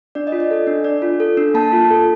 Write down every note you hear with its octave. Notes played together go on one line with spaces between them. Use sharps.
D4 D5
D#5
F4
D5
A4
D4
D4 D5
F4
A4
D4
A#3 A5
F4
A4